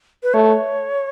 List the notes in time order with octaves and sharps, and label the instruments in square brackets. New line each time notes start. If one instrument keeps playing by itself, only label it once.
[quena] B4
[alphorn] A3 [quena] C#5